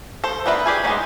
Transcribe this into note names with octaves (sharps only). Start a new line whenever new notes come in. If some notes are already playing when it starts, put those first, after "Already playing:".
A4 C5
B3 D4 A#4 B4 E5
G4 G#4 G#5
G#3 B3 C#4 D#4